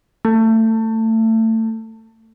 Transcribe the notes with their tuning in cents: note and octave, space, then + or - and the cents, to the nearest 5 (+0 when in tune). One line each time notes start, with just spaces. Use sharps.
A3 +25